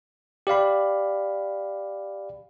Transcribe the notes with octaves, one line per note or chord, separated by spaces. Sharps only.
G4 D5 F5 B5